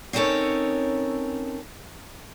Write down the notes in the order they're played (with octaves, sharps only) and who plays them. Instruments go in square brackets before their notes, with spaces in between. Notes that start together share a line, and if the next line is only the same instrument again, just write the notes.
[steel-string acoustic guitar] C4 C#4 D#4 A4 A#4 C#5